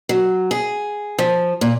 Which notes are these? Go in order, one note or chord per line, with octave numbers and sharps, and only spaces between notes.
F#3
G#4
F3
A#2